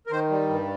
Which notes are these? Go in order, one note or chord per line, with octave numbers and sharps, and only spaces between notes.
A#4
D#3 C5
G3
G2